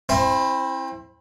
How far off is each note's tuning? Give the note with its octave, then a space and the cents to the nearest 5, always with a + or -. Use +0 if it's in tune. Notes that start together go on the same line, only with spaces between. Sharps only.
C4 +35 E4 +0 C5 +0